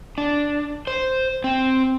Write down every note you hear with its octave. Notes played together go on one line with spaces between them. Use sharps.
D4
C5
C4